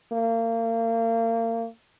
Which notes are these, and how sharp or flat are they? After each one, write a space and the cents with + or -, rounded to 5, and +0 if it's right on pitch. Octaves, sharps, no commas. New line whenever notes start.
A#3 -35